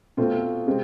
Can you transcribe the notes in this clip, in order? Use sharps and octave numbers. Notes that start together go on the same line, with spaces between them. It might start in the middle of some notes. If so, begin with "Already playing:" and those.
B2 A3 C4 F4 A4
C3 G#3 C4